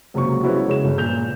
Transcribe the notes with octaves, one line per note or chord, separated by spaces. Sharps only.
C#2 C3 F#3 A#3 C#6
F3 G#3 B3 C#4 E4 F#4
C#3 G#3 C#5 E7
G1
A#2 G6 F7